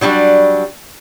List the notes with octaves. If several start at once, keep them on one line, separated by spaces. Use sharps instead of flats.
F#3 G3 D4 F4 F#4